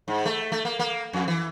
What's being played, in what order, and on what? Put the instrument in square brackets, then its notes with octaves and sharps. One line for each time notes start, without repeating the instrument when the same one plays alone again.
[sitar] G#2
A3
A3
A#3
A#3
F2
E3